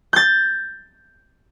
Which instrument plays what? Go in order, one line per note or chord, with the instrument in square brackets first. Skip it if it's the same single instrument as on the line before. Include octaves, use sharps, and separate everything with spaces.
[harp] G6 A6